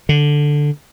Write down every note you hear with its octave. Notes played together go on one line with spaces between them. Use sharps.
D3